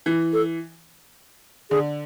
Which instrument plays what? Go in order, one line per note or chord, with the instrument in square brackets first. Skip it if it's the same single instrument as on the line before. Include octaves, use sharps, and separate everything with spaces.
[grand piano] E3
[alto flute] A4
[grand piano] D3 [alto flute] G#4